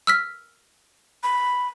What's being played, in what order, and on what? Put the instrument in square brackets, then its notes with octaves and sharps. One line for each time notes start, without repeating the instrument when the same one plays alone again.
[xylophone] E6 F6 B6
[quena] B5